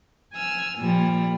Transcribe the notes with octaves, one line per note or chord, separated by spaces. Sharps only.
G#5 E6 F6
A#2 F3 G3